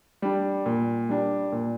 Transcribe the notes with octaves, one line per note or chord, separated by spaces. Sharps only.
G3 D4
A#2
G3 D4
A#2